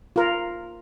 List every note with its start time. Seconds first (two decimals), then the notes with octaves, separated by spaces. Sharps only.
0.16 F4 A#4